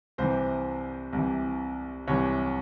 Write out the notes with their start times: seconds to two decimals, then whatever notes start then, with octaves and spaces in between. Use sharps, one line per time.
0.18 C2 C3 E3 C5
1.13 C2 C3 E3
2.07 C2 C3 E3 C#5